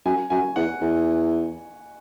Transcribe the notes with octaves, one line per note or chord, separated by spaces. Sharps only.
F#2 G#5
F#2 G#5
E2 F#5
E2